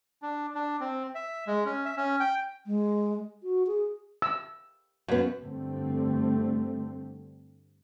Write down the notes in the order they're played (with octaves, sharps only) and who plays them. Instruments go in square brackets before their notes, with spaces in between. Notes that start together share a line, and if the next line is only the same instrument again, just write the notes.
[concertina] D4
D4
C4
E5
G#3
C#4
E5
C#4
G5
[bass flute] G#3
F#4
G#4
[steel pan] E6
[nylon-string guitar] F#2 B3
[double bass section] G2 D3 A3 C4